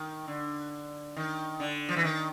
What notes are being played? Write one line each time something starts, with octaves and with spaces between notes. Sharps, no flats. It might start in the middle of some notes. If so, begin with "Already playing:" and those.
Already playing: D#3
D3
D#3
D3
F3
E3
D#3